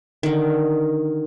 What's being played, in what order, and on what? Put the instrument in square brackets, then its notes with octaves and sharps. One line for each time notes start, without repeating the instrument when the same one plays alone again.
[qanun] D3 D#3